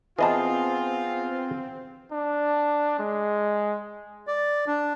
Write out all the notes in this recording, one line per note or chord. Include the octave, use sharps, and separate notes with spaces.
E3 B3 C4 F4 G#4 D#5 A5
D4
G#3
D5
D4